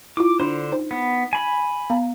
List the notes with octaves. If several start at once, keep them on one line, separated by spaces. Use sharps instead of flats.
E4 F4 D6
D3 D4 C5 C6
D#4 C5
B3
G#5 B5
B3 F5 A#5